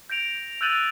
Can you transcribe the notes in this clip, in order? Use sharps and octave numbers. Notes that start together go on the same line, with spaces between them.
G6 A#6 D7 F7
E6 F#6 G6 A6 D#7 F#7